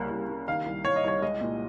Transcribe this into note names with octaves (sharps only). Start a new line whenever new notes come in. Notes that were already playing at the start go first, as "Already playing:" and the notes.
Already playing: C2 C#3 A#3
C2
A#3
D#3 F5
C2
C2 C#5
D#5
C2 C#5
G#3 D#5
A#2